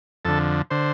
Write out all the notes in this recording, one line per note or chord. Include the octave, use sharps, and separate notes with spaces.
F2 D3 A4
D3 C5